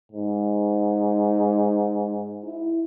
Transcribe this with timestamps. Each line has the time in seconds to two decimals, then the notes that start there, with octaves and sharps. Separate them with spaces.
0.12 G#2
2.44 E4